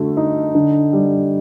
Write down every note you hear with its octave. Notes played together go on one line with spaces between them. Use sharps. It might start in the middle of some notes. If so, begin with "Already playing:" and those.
Already playing: D3 A3 F#4
D#4
D3
G3